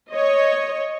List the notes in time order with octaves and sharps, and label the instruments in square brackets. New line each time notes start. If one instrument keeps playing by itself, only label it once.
[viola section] C#5 D#5